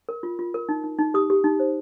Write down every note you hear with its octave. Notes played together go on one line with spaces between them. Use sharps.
A#4
F4
F4
A#4
D#4
D#4
D#4
G4 D#6
G4
D#4
C5